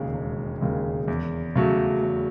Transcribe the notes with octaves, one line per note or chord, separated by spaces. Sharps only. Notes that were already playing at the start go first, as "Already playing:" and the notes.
Already playing: E1 D#2 C#3 G#3
E1
D#2 C#3 G#3
E2
C#3 F#3 A3
E2